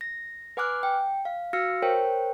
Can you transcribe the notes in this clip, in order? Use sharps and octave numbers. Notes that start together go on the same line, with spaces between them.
A#6
B4 F#5 G#5 D6 F6 F#6
G5
F5
F#4 F5 E6 F6 A#6 C#7
A#4 C5 C#5 G5